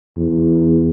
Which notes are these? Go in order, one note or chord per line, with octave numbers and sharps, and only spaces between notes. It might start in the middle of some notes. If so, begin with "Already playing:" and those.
E2